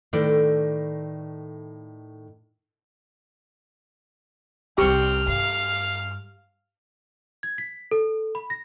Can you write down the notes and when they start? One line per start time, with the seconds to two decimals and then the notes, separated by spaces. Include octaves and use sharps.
0.13 A2 D#3 A4 B4 D5
4.78 C2 G3 C4 G4 C#6 F6
5.28 G2 F5
7.43 G#6
7.58 B6
7.91 A4
8.35 B5
8.50 A#6